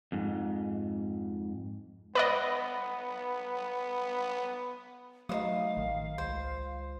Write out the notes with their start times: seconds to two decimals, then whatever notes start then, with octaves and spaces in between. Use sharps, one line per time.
0.12 F2 G#2
2.15 B3 B4 D5 D#5
5.29 F#3 A3 D#4 C5 F5 D#6
5.77 A1 D#3
6.18 C#2 C5